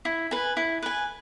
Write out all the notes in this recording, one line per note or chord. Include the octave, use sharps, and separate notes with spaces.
E4
B4 G#5
E4
B4 G#5